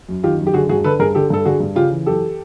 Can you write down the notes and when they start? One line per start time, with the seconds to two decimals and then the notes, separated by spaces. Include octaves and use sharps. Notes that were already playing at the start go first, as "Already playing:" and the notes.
0.09 F#2
0.23 D#3 F4 G4
0.39 F#2
0.47 G4
0.54 D3 F#4 G#4
0.69 G2 F#4 G#4
0.84 D3 A4 B4
0.99 G2 G#4 A#4
1.15 D3 G4 A4
1.30 G2 A4
1.45 D3 F#4 G#4
1.60 G2
1.75 C#3 F4 G4
1.91 E3
2.06 F#2 G4 A4